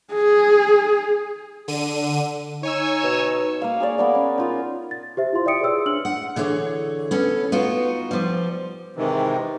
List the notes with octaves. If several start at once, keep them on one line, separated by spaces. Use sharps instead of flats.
G#4
D3 D#7
D#4 C#5 G#5 E6
B2
A#3 F5
G#4 C#5 D5
B3 A#4 D5
C#4
D#4 F4 A#4
A6
G4 C5 E5
E4 F4 F5 C6
D5 E5 G5 D#6 C#7 D7
G#4 B4 C#5 C6 E6
D4 F6 F#7
F#5
D3 E3 G#4 C#5
B3 C#4 A4
B3 D#4 F4 F#4
F3 G3
G#2 C3 D#3 E3